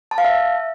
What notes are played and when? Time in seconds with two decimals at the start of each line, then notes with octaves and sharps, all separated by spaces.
0.11 A5
0.18 F5
0.25 E5